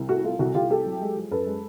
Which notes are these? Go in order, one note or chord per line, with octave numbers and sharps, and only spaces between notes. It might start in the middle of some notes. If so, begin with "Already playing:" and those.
Already playing: C2
A3 F#4
A3 F4
C2 F#4
C2 F4 G4
A3 G4 A4
F#3
G#3
F3
F#2 A4 B4
G#3